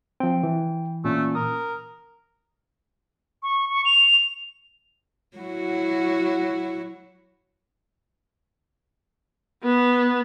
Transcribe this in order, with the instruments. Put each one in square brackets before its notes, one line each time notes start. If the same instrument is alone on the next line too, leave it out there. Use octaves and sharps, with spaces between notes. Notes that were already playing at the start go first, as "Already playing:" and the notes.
[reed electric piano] F3 C4 [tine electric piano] G5
[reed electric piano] E3
[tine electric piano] A#2 C#4 [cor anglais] A3
[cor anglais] A#4 [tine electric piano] D#6
[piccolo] C#6
C#6
F7
[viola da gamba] F#3 E4 F#4
[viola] B3